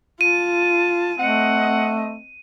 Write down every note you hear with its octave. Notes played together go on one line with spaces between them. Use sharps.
F4 A5 D#7
A3 C4 D#5 F#5